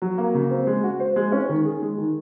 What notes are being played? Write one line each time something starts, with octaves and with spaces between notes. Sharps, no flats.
F#3
A#3
C#3
C4
G#3
F#4
C5
G#3
C#4
D#3
G#4
G#3
D#3